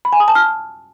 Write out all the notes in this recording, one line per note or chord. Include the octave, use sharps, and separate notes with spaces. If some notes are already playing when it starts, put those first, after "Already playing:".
B5
G#5
D#6
A5
F6